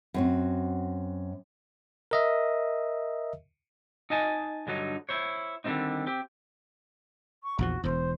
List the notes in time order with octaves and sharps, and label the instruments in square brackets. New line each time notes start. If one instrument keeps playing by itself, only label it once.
[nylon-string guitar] F#2 C4 F#4
[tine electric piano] A#4 D#5 E5
[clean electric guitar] D#4 D#5 G#5 A5
G2 D3 F#3 D#4
E4 C5 C#5
D3 D#3 G3 A#3 C4 D#4
C4 G4
[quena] C#6
[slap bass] A#1 E2 F3 [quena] F#4
[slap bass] E1 E2 [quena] C5